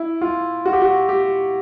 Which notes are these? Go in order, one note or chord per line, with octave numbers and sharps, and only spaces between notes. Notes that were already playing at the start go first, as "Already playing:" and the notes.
Already playing: E4
F4
F#4
G4
F#4
G4